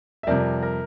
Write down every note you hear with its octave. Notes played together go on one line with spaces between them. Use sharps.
E5
F2 C3 G3 A#4 D5
A#4